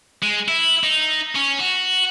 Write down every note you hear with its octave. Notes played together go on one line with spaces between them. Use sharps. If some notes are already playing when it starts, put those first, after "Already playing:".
G#3
E4
D#4
C#4
F#4